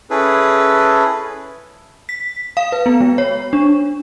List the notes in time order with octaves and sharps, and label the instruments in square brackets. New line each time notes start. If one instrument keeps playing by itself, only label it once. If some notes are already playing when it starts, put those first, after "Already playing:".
[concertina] C#4 E4 G#4 A4 B4
[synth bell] B6
F5
B4
B3
G#3
C#5
D4